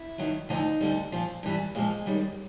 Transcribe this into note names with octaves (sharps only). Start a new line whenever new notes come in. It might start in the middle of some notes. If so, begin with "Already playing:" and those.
Already playing: E4
G2 D#3 F#3
D2 D3 F3 D#4
D2 D3 G3
A#2 F3
G2 E3 G3
A#2 F3 G#3
F#2 D#3 G3